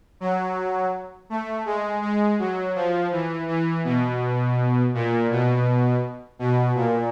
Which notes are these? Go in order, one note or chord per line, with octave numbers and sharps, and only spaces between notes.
F#3
A3
G#3
G#3
F#3
F3
E3
E3
B2
A#2
B2
B2
A#2